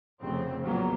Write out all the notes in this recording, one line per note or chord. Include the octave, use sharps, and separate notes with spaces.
F1 C#3 C4
A#1 A#2 F#3 A#3 B3